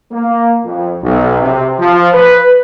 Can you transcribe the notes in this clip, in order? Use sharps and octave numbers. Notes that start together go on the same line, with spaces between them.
A#3
F2
B1
C3
F3
B4